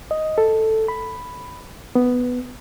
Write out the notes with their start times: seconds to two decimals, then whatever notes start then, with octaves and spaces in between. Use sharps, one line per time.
0.11 D#5
0.38 A4
0.88 B5
1.95 B3